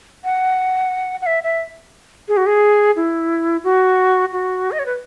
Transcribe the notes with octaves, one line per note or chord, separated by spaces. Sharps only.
F#5
F#5
E5
E5
G#4
F#4
G#4
E4
F#4
F#4
D#5
C#5
B4